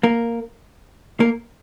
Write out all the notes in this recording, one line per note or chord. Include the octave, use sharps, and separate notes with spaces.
A#3 A#4
A#3 A#4